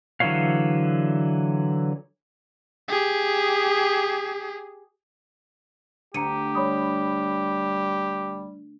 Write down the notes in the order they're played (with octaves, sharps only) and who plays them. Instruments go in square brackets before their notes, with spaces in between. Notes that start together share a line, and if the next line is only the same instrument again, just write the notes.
[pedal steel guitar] D3 E3 F#3 C#5 F5
[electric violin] G4 G#4
[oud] D2 [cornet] G4 [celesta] A#5 C#7 D#7
[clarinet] G3 [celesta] C#5 B5 D#6